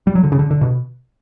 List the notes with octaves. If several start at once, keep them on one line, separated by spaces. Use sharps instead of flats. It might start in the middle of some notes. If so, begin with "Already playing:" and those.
G3
F#3
D3
C#3
D3
D3
B2